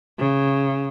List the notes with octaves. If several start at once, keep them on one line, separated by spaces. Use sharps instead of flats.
C#3